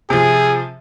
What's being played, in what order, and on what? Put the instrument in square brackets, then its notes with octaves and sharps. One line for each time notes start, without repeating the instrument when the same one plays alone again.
[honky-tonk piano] C3 F3 [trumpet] G#4